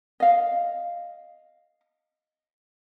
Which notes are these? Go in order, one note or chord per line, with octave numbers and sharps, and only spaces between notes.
D#5 F5